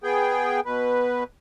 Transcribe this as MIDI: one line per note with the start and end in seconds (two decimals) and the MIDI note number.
0.04 0.60 59
0.04 0.60 68
0.04 0.60 79
0.65 1.24 47
0.65 1.24 71